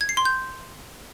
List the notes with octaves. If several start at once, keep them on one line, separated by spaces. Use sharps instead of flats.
G#6
C7
C6
G6